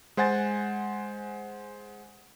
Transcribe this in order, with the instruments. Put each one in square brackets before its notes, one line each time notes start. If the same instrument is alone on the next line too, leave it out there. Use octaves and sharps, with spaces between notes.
[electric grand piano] G#3 C5 F#5 G#5 A6